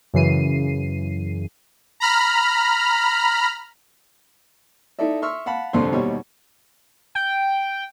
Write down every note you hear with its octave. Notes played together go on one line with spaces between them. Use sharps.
F#2 C#3 E3 C7 D#7
A#5 B5 F6
D#4 E4 A4 D5 E5
E5 C6 C#6 E6 F6
F5 F#5 A5 B5
C2 F2 D3 A4 D5 C6
D#2 B2 G3 C#5
G5